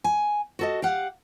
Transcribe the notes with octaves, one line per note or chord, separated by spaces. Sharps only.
G#5
F#4 A4 D#5
G4 F5 F#5